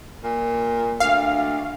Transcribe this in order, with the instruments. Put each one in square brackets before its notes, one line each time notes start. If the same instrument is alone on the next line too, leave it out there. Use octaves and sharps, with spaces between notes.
[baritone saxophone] A#2
[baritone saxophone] D2 [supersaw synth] F5